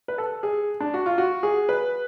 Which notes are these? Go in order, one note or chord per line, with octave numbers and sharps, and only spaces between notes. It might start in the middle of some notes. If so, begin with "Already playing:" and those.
B4
A4
G#4
D4
F#4
F4
F#4
G#4
B4